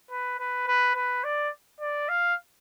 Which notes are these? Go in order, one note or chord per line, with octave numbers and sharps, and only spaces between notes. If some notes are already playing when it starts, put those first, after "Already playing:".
B4
B4
B4
B4
D5
D5
F5